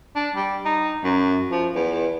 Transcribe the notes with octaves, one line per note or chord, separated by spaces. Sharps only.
D4
G3
D#4
F#2
F3
E2